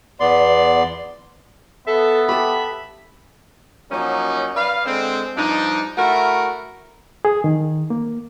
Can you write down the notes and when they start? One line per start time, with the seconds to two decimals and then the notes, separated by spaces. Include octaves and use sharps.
0.20 E2 B3 D5 C6
1.87 B3 A4 E5
2.29 G4 A4 B5
3.90 F3 F#3 A#3 C#4 D#4
4.54 B4 D5 F5
4.85 D3 G#3 C4
5.36 G2 F3 D4 D#4
5.97 A3 E4 F#4 A#4
7.25 G#4
7.44 D#3
7.90 A#3